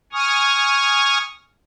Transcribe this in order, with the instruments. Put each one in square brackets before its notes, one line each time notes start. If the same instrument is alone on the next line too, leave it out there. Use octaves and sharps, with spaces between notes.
[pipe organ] G#5 C#6 D#6 F6